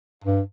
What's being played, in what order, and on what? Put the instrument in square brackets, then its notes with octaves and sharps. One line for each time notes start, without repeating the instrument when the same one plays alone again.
[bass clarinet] G2